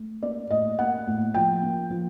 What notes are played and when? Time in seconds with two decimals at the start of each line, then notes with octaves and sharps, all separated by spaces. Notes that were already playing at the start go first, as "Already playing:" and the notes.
Already playing: A3
0.22 A#3 D5
0.50 A2 D#5
0.79 A#3 F#5
1.07 A2
1.34 F3 G5
1.62 A#3
1.90 F3